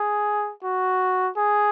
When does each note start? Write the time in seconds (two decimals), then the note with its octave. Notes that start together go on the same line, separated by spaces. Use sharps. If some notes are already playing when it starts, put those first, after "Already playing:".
Already playing: G#4
0.64 F#4
1.37 G#4